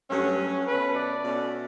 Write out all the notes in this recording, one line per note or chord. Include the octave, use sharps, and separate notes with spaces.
G2 F#3 A3 C#4
B2 A3 C#4 B4
D5
B2 A3 C#4